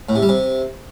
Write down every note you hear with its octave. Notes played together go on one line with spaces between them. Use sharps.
A2
C3
G3
C3